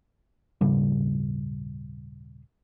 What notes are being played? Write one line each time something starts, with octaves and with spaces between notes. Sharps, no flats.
D#1 G#2 C#3 G3